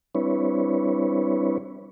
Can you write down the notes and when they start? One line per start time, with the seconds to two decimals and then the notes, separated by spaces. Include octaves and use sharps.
0.15 G3 C4 D4 E4 B4 C#5